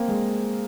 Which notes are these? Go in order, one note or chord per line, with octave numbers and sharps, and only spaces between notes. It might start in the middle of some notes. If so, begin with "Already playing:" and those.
Already playing: A#3 C4
G#3